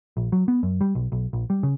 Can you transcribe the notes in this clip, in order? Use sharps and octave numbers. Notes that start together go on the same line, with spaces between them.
A#1
F#3
B3
F#2
G3
B1
B1
A#1
G3
C#3